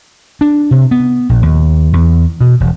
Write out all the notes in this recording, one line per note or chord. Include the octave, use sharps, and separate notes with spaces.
D4
C3
B3
A#1
D#2
E2
B2
E1